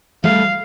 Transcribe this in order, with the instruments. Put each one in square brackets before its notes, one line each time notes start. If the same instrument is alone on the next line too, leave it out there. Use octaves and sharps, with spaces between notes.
[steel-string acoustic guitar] G3 A3 [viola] F5